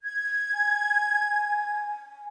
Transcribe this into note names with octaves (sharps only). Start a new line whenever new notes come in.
G#6
G#5